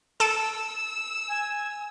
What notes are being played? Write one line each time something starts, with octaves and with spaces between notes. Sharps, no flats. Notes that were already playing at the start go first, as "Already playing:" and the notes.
A4 A5 E6 D7
G#5